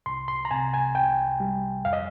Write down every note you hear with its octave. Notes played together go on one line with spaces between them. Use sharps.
C2 C6
C6
A#5
C3 G#5
G#5
C2 G5
G3
F2 F5
D#5